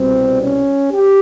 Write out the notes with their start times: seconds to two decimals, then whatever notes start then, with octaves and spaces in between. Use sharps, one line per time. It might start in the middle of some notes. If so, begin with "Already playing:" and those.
Already playing: C2 B2 G3 C4
0.41 C#4
0.90 G4